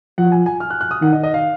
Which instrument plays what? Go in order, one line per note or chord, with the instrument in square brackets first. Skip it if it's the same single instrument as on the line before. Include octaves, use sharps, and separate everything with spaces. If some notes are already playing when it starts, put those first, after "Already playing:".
[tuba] F3 [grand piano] F#5
[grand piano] G#5
G#5
F6
F#6
F#6
D#6
[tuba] D#3 [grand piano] F#5
[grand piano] D#5
D#5
F5